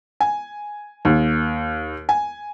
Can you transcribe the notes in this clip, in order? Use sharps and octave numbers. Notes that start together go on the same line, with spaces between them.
G#5
D#2
G#5